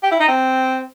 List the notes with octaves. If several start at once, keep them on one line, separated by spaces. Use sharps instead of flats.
G4
E4
D#4
C4